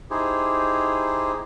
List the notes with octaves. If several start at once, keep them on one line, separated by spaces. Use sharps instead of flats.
D#4 E4 G4 G#4 C5